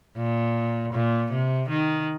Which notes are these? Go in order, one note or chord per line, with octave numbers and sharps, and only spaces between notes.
A#2
A#2
C3
D#3